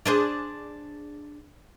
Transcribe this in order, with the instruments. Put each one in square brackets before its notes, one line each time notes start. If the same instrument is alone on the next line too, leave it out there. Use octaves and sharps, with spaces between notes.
[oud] D4 G#4 C5